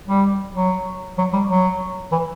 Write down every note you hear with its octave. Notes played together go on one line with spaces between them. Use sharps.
G3
F#3
F#3
G3
F#3
E3